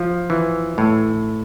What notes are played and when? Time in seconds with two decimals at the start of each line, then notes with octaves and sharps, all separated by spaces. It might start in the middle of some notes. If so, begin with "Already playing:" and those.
Already playing: F3
0.30 E3
0.78 A2